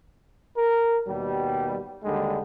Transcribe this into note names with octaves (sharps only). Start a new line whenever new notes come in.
A#4
D#2 B2 G3
D#2 D3 G3 G#3